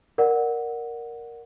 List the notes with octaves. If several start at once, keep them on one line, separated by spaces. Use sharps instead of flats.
A#4 D5 F#5